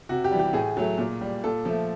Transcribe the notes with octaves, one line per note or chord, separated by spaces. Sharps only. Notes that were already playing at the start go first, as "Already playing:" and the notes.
C3 F#4
G4
E3 G3
G4
A2 G#4
F#3 A3
A#2
G3
A#2 A4
F3 A3